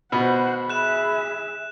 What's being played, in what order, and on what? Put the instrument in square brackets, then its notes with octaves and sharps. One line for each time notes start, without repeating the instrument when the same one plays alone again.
[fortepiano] B2 [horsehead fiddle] C5 F#5 [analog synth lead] B5
[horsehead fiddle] G#4 E5 [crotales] F#6 E7